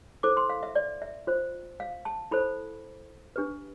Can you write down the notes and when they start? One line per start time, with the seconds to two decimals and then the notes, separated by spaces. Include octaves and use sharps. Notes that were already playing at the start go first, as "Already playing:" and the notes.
0.23 E4 A4 C5 D6
0.37 C6
0.50 F5
0.63 E5
0.75 D5
1.02 E5
1.27 F4 C5
1.80 F5
2.05 A5
2.31 E4 A4 C5 B5
3.36 D4 G4 B4